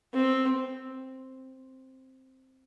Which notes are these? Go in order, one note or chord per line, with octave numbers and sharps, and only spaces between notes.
C4